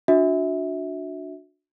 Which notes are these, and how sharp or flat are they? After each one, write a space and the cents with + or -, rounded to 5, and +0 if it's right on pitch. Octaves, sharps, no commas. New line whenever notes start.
D4 +0 F#4 -30 E5 -25